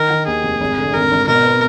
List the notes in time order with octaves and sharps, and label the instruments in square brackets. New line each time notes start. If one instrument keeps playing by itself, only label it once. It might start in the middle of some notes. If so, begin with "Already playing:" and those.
Already playing: [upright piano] D#3 [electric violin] A#4
[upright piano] D#3
[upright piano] D#2 [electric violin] G#4
[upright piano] F1
G#1
D3
[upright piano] G#1 [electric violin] A#4
[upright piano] G#1
[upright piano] B2 [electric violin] A#4
[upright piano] B3